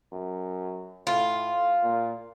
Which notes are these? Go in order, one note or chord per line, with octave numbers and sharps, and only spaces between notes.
F#2
A2 F4
A#2